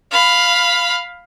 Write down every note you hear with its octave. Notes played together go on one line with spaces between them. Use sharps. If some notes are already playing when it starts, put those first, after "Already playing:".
F5 B5